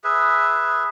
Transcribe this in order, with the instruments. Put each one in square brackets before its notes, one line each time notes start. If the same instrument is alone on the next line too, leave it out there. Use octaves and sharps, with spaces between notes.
[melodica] G#4 B4 E5